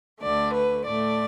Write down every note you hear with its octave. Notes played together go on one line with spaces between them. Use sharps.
D2 D3 A3 D5
B4
A2 A3 D5